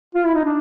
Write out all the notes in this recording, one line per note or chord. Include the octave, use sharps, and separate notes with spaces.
F4
E4
D#4
D4